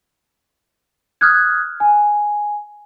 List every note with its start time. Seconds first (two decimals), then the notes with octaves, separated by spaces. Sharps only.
1.21 D#6 F6 F#6 G#6
1.80 G#5